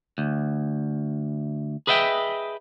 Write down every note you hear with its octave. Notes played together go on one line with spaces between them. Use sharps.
D2
G#4 B4 D#5 E5 F#5 G5